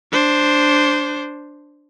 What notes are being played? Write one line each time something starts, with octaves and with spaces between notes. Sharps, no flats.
D4 C5